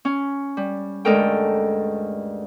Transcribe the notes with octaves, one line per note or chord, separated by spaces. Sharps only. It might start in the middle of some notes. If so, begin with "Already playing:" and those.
C#4
G3
D2 G2 G#3 A4 A#4 G5